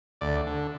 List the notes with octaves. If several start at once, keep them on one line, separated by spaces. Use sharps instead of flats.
D2 D5
D3